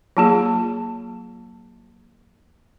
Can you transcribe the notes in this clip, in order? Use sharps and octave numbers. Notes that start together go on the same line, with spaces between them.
F#3 A#3 F4 G#4 A5